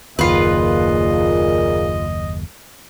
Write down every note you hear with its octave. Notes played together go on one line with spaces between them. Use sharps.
F#1 D#2 A#2 A#3 F4 G#4 B4 D#5